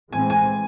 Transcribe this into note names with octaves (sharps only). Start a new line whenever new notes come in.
A2 E3 G#3 C4 G#5
G#5